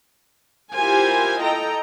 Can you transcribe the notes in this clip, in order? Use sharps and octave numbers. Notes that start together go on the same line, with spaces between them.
E4 F4 G4 A#4 C5 G#5
A4 D#5 G5 A#5